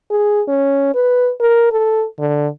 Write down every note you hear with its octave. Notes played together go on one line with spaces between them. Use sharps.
G#4
C#4
B4
A#4
A4
D3